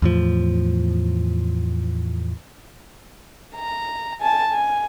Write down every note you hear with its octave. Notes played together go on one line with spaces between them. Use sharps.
E2 A2 F3
A#5
G#5 A5
G#5